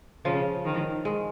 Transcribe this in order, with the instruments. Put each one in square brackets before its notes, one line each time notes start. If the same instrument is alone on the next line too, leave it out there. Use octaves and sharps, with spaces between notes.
[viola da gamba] C#3 [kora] F3 F4
[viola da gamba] D#3
[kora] G#3